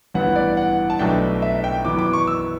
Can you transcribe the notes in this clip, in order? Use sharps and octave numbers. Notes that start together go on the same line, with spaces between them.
A1 G2 E3 B3 F#5
D5
F#5
A5
B1 B2 A3 D4 G5
E5
G5
F#2 E3 B3 D6
D6
C#6
E6